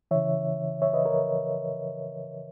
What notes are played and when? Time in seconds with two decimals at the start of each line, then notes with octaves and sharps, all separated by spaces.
0.11 C#3 E3 C#5 E5
0.82 C#5 E5
0.93 B4 D#5
1.05 A#4 C#5